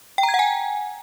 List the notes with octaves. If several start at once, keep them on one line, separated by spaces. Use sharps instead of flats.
G5
A#5
G#6
F#5
G#5